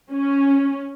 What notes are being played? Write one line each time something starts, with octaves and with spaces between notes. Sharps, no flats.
C#4